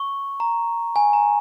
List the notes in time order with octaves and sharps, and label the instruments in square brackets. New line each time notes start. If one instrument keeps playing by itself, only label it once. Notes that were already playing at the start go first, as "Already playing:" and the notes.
Already playing: [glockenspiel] C#6
A#5
G#5
A#5